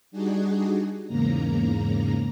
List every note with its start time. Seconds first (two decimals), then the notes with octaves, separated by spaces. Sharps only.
0.11 G3 D4 D#4 F#4 G#4
1.07 E2 G#2 C#3 A#3 A#5